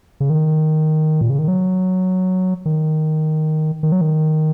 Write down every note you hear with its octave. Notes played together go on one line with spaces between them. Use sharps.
C#3
D#3
A#2
C#3
D#3
F#3
D#3
D#3
F#3
D#3